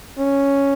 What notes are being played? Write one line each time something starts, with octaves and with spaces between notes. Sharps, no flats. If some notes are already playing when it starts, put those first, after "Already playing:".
C#4